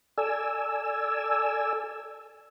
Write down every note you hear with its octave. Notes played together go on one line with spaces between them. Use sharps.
A4 D5 G#5 E6